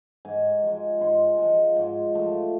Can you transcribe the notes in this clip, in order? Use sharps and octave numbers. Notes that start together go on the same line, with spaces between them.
G#2 G#5
F3 G#3
G#2 C6
F3 G#3
G#2
F3 A3